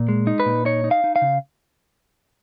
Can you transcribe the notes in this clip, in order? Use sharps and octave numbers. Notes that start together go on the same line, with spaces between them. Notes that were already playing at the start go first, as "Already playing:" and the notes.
Already playing: A#2
G#3
D#4
B4
A#2
D#4 C#5
D#4
F5
D#4
F5
C#3